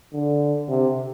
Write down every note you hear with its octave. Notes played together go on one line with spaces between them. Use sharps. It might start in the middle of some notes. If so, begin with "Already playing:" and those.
D3
C3